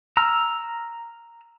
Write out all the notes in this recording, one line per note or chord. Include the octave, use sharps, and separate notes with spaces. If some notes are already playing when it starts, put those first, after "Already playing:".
A#5 E6 F6